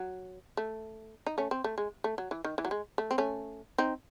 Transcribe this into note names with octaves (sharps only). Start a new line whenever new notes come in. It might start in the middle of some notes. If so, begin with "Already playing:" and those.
Already playing: F#3
A3
D#4
A3 C#4
C4
A3
G#3
A3
F#3
E3
D#3
E3
F#3
G#3
A3
C4
A3 C#4
C4 D#4